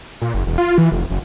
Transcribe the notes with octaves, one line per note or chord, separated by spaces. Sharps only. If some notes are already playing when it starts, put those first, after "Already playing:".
A#2
F#1
E1
F4
E3
F1
F#1